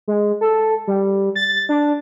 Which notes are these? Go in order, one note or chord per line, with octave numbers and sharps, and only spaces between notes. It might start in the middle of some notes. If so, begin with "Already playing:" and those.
G#3
A4
G3
A6
D4